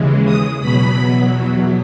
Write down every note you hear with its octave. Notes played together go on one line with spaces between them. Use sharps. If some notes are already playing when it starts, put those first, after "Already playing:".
Already playing: D#2 C#3 E3 G#3
D#6
E2 B2 F#3 B5